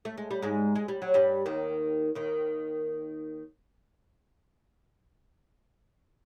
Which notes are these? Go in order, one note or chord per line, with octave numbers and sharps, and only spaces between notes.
A3
G#3
G3
G#2 G#3
G#3
G3
F#3
G2 G3
D#2 D#3
D#2 D#3